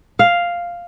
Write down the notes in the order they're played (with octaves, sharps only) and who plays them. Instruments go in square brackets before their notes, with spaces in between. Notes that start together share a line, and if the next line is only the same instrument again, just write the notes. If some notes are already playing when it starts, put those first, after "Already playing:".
[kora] F5